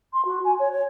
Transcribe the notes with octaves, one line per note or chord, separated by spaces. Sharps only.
C6
F#4
G#5
C#5
C#5